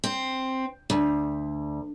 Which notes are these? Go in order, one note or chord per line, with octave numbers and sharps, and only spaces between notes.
C4
D2